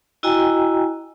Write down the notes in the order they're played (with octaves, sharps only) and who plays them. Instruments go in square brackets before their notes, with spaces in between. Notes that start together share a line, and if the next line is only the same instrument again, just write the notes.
[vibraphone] E4 F#4 D#5 G5 G#5 A#5